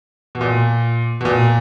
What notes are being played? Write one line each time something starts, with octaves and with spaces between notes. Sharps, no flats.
B2
A#2
B2
A#2